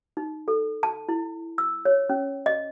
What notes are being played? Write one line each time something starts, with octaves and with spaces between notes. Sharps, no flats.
D#4
A4
A5
E4
E6
C#5
C#4
D#5